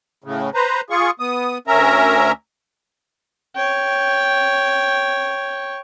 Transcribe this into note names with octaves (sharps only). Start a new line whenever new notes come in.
A2 C#3
B4 C5 A#5
F4 G#4 C#6
B3 D#6
D2 C#4 A#4 E5 A#5
C#5 G5